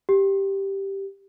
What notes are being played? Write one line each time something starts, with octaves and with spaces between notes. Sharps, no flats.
G4